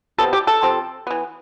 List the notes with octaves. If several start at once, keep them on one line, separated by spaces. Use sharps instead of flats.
C3 G3 B3 A4
G4
A4
C3 F3 C4
E3 B3